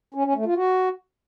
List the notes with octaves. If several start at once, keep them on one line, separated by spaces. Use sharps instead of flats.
C#4
C#4
A3
F4
F#4